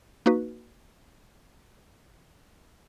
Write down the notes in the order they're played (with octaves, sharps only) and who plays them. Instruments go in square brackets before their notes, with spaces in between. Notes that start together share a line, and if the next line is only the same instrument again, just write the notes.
[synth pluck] A#3 D#4 F#4 B4